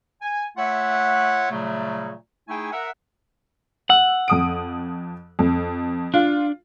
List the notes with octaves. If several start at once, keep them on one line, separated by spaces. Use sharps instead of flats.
G#5
A3 F4 C#5 E5 F#5
A#2 C#3 F#3 G3 A3
A3 D#4 E4 G#4 G5 G#5
A#4 E5 F#5
F#5 E6
F2 D#6 D7
F2
D4 F4